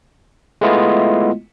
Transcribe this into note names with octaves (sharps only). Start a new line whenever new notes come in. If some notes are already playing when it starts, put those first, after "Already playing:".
G#3 A3 B3 E4 F4 D#5